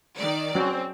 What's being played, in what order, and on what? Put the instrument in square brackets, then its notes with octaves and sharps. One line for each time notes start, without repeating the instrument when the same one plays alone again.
[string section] D#3 D5
[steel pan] F#3 C#4 F#4 [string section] C4